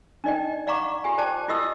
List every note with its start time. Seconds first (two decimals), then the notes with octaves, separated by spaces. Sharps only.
0.24 D4 D#4 D5 D#5 G5
0.67 D5 F5 F#5 A#5 C#6 D6
1.04 F4 G4 G#5
1.18 C5 D5 G5 A5 D6
1.48 E4 F4 G4 D#5 D#6 E6